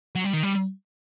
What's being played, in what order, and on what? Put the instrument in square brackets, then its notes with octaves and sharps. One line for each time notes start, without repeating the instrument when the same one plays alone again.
[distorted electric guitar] F#3
G3
D#3
G3